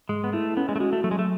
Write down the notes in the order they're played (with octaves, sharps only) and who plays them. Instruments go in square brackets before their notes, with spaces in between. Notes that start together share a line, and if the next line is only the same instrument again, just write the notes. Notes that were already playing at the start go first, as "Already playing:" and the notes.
[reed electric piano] G#2 [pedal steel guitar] G#3
[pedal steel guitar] B3
[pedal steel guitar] A3 [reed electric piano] E4
[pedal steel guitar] B3 [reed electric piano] C#4
[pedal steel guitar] G#3
A3
[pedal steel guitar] G#3 [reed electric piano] F#4
[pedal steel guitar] A3
[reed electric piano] F#3 [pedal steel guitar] A3
[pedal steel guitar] G#3
A3